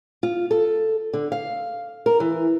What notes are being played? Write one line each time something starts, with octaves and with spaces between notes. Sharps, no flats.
F4
A4
D3
F5
A#4
E3